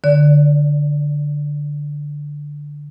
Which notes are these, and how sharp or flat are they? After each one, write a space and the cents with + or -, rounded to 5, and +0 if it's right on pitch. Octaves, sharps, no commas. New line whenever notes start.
D3 +0 D5 -35